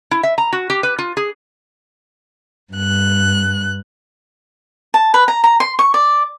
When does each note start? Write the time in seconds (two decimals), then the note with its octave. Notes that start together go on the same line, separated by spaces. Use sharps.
0.11 E4
0.23 E5
0.38 A#5
0.53 F#4
0.70 G4
0.83 B4
0.99 F4
1.17 G#4
2.72 G2 F#6
4.94 A5
5.14 B4
5.28 A#5
5.44 A#5
5.60 C6
5.79 C#6
5.94 D5